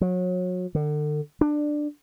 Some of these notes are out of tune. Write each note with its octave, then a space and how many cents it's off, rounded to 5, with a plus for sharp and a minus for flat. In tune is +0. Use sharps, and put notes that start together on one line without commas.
F#3 -30
D3 +35
D4 +15